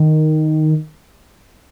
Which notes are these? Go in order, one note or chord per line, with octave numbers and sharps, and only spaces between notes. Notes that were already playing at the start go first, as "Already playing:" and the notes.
Already playing: D#3